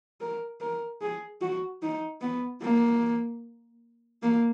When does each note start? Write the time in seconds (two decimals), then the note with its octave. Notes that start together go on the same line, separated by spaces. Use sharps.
0.21 A#4
0.60 A#4
1.01 G#4
1.41 F#4
1.82 D#4
2.22 B3
2.62 A#3
4.23 A#3